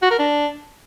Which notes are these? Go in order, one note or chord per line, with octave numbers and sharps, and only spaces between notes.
F#4
A#4
D4